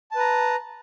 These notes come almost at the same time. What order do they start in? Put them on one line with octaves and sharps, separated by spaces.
A5 B4 A#5